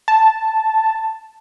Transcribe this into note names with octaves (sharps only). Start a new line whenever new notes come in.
A5